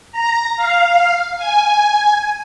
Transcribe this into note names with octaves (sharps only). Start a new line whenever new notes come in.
A#5
F5
G#5